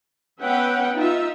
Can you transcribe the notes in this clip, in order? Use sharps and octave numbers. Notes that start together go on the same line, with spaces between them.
B3 C#4 B4 E5 F#5 G5
D#4 F4 E5